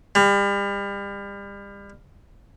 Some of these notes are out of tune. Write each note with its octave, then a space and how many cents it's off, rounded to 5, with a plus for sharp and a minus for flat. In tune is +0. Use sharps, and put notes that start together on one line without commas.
G3 +35